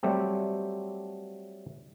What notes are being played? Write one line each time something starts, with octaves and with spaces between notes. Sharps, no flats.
F#3 G3 A3 C4 G4